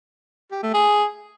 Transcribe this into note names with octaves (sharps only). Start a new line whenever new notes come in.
G4
A3
G#4